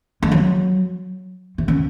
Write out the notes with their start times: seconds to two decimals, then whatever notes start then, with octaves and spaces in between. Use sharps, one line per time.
0.23 G#3
0.31 F#3
1.58 C3
1.68 C#3